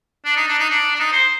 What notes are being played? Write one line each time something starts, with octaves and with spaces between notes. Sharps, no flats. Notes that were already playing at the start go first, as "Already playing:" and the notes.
D4
D#4
D4
D#4
D4
D4
D#4
C5